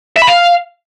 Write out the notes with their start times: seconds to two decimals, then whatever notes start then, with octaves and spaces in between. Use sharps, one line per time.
0.16 E5
0.22 B5
0.27 F5